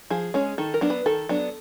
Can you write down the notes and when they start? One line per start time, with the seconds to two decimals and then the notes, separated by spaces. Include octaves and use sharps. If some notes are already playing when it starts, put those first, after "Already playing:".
0.10 F3 G#4
0.34 G#3 C#4
0.58 D#3 A4
0.74 A#4
0.81 F#3 B3 D4
0.90 B4
1.06 D#3 A4
1.29 F#3 B3 D4